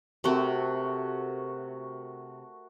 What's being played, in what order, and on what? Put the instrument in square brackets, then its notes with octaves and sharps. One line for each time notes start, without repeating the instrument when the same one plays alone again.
[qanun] C3 C4 [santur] A3 F#4 A#4